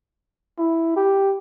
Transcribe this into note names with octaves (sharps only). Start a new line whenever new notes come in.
E4
G4